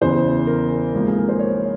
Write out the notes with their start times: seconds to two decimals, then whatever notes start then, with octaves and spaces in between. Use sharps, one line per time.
0.01 E2 C#3 E3 C5
0.47 A#4
0.93 G#1 G#2 F3 A#3
1.07 G#4
1.19 A#4
1.29 C5
1.39 C#5